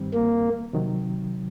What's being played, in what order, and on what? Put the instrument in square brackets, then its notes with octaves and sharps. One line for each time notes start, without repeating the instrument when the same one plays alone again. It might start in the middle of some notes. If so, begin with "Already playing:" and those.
Already playing: [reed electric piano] G2 D#3 G3 C4
[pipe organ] A#3
[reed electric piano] C3 D#3 F#3